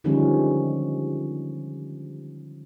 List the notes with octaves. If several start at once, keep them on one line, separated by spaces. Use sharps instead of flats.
D3 D#3 F3 G3 G#3 C#4